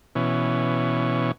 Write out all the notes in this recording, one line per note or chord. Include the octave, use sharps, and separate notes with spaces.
B2 E3 C#4